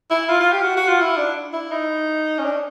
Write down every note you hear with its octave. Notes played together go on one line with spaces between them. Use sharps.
E4
F4
F4
G4
F#4
F#4
F4
E4
D4
E4
D#4
C#4
D4